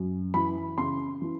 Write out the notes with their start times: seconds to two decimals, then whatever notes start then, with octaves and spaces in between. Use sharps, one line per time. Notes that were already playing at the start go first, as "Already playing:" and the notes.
Already playing: F#2
0.34 E3 B5
0.78 C#3 C6
1.22 E3